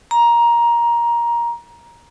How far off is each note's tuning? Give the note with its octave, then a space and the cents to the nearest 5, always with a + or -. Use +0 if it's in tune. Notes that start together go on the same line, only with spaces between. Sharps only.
A#5 +15